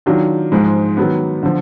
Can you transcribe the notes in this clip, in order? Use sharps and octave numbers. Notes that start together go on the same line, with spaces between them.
D#3 F#3 D4 F4
G#2 F3 G#3
D#3 F#3 B3
D3 F3